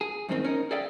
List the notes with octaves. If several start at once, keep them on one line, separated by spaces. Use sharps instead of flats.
G#4
F#2 A2 D#3 A#3 C4 D#4
C#4 D#4 A#4
G#4 A4 D5 E5 F5 G5